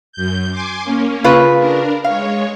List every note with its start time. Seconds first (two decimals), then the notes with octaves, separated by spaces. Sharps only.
0.13 F#2 G6
0.51 G#5 C6 D6
0.84 A#3 C#4
1.24 C#3 F4 B4
1.57 D4 A#4
2.04 G#3 C#5 F5